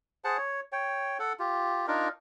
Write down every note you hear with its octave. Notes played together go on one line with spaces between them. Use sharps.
G#4 C5 F#5 A5
C#5
C#5 G5
A4 F#5
F4 G4
D4 D#4 F4 A#4